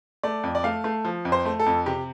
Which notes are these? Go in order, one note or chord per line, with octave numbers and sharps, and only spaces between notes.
A3 D5
F2
D5
A3 F5
A3
F3
F2
C5
A3
A4
F2
C3 G4